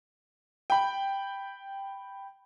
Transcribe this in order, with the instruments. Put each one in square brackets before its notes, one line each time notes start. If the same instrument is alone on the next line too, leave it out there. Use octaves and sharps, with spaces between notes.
[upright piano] G5 B5